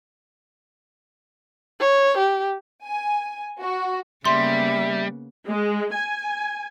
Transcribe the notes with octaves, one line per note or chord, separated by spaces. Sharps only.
C#5
G4
G#5
F#4
C#3 G3 A#3 B3 E5 C6
G#3
G#5